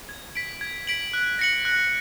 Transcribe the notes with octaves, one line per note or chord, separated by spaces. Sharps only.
G#6
B6 D7 F#7
G#6
B6 D7 F#7
F#6
A#6 C#7 F#7
F#6